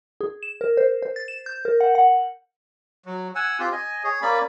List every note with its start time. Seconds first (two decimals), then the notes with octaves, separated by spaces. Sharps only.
0.21 G#4
0.43 E7
0.61 A#4
0.77 C5
1.02 C5
1.16 A6
1.28 E7
1.46 G6
1.65 A#4
1.80 F#5
1.95 F#5
3.06 F#3
3.35 F#5 G#5 E6
3.59 C4 F4 G4
3.72 D#5 G#5
4.04 G#4 C#5
4.22 A#3 C#4 D5 B5